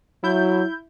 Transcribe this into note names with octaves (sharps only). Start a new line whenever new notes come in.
F#3 E4 G6